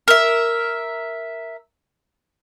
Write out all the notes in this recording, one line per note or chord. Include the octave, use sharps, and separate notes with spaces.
A#4 E5